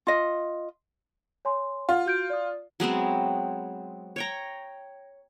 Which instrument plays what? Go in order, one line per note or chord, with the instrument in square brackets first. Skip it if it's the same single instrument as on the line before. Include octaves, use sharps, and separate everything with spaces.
[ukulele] F4 D#5
[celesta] C#5 G#5 C6
[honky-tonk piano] F4 [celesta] F#5
[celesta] F#4 G6 D7
D5 D#6
[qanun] F#3 G#3 B3 C4
C#5 G5 A#5